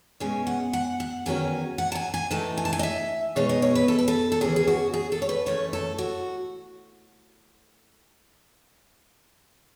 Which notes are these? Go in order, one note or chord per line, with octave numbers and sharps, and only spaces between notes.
B2 G#3 C#4 G#5
F#5
F#5
F#5
E2 D#3 F#3 C#4 G#5
F#5
A5
G#5
G#5
A2 E3 A3 D#4 A5
G#5
A5
G#5
D#5
E5
B2 G#3 D#4 C#5
D#5
C#5
B4
A4
B4
A4
A4
D#2 C#3 E3 G#4
G#4
F#4
G#4
A4
C#5
B4
F#2 E3 A3 C#4 C#5
A4
F#4